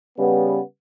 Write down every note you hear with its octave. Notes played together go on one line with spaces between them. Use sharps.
C#3 G3 B3